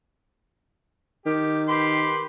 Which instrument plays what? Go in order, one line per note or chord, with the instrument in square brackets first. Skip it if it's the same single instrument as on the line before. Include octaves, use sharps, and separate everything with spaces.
[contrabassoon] D#3 [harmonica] G4
[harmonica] G4 B4 C6